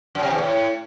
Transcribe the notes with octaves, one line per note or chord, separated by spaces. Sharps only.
F#2
C3
E2
A2